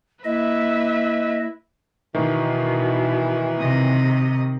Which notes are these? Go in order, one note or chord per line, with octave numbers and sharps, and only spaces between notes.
A#3 E4 B4 D#5 E5
B2 D#3 E3
C3 D#5